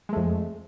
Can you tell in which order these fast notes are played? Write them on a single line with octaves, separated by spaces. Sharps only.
G#3 A3 F2